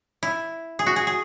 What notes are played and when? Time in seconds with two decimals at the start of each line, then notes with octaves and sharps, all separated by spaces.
0.23 E4
0.79 G#4
0.86 F#4
0.96 G#4
1.07 G#4